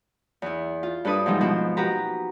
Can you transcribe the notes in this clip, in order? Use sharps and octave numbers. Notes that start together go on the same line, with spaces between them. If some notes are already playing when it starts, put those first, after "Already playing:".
E2 E4
F4
G2 D4 A4 B4 D#6
G#2 E3 F3 G3 D#4
B2 F3
F#4 G4 B4 A#5